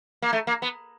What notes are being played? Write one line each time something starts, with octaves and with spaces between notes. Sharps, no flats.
A#3
A3
A#3
B3